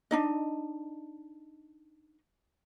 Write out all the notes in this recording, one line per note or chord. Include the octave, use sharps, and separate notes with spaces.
D4 D#4 D#5